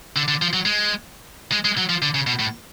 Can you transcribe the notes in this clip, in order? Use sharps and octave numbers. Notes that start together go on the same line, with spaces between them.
D3
D3
F3
F#3
G#3
G#3
G#3
F#3
F3
D3
C#3
B2
A2